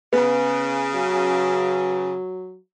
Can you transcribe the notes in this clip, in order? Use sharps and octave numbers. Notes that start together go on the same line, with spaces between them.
C#3 B3
F#3